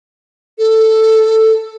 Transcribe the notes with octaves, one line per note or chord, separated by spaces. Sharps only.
A4